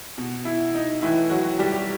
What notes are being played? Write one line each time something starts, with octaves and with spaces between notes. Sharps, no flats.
B2
E4
D#4
A2 E3 E4
F#3 F#4
G3 G4